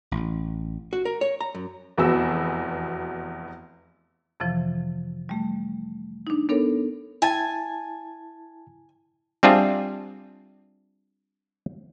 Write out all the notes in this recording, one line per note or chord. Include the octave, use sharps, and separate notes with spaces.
A1
F#4
A#4
C#5
A#5
F#2
F1 E2 B3 F#4 G#4 E6
F2 C3 E3 F3
G3 A3
D4 D#4
B3 D4 A4 A#4 C#5
E4 G#5 A5 A6
G3 C4 D4 F4 G#4 E5